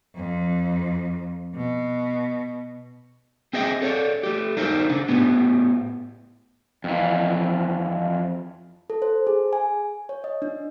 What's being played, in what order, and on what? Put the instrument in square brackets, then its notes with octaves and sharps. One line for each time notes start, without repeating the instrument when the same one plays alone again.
[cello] F2
B2
[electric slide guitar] C4 G#4 C5 D#5 E5 G5
A4 C#5 D5
A3 G4
D4 D#4 A#4 C5
C#3 D4
A2 B3 G4
F2 E3
[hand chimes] A4
C5
G#4
G#5
C#5
D#5
D4